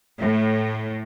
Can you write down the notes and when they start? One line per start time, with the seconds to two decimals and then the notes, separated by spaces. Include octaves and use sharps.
0.19 A2